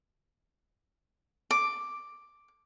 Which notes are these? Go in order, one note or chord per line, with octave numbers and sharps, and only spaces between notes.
D6